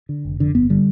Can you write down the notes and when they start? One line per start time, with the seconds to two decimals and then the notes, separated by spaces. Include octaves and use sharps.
0.09 D3
0.25 F1
0.39 F2 D3
0.55 G1 B3
0.70 D3 G3